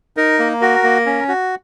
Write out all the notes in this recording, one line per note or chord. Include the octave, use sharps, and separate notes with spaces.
D#4 A#4
A#3
F#4 A#4
A#3
C#4
F#4